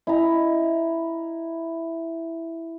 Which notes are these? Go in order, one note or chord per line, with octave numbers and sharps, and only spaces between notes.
E4 D#5 A#5